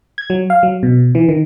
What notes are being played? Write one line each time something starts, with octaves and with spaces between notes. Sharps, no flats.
G#6
F#3
F5
F#3
B2
E3
D#3